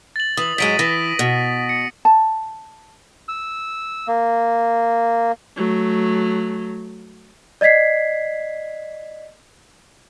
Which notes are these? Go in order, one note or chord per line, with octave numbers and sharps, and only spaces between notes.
A6 F#7
E3 D#6 F#7
G#2 F#3 G#3 B6 D7 D#7
E3 A#6
B2
C#7
A5
E6
A#3
F#3 A3
D5 D#5 G#6 B6 C7